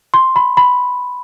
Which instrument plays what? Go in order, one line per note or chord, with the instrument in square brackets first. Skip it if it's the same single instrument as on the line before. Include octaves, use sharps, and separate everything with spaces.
[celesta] C6
B5
B5